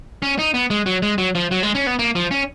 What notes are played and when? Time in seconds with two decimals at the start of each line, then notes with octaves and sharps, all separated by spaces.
0.22 C#4
0.39 D#4
0.54 B3
0.70 G#3
0.86 F#3
1.02 G#3
1.18 F#3
1.35 F3
1.51 F#3
1.63 G#3
1.75 C#4
1.87 B3
1.99 A#3
2.15 F3
2.31 C#4